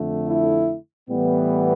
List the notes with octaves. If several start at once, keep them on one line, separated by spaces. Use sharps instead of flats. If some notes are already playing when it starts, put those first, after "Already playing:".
Already playing: F2 D3 A3
E4
A2 E3 G3 B3